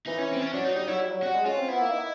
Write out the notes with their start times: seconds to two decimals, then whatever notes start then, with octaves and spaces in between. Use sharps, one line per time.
0.07 E3 D#4
0.19 C#4
0.33 C4
0.42 C#4
0.53 F#3 D4
0.64 F#3 D#4
0.76 G3 D#4
0.88 F#3 E4
1.00 G3
1.11 F#3
1.23 G3 F#4
1.34 G#3
1.46 C#4 F4
1.58 C4
1.68 B3 E4
1.81 A#3
1.92 D#4